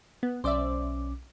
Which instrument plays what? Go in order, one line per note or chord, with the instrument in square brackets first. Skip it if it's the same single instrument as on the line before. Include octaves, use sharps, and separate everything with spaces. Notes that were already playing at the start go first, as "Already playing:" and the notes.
[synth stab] B3
[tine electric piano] B1 C#4 D6 [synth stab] C5 D5 E5